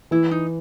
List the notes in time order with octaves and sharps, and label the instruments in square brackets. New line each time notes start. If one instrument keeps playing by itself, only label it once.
[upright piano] E3 [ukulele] E4
[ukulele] D#4